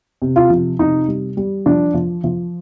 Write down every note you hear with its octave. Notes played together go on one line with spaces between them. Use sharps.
C3
F4
F3
C3 D#4
G3
G3
F3 D4
F3
F3